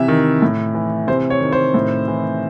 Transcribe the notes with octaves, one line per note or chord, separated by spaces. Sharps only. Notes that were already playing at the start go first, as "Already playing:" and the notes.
Already playing: C3 E3 E5
D#3
A2
E3
C3 C5
C#5
D#3
C5
A2
E3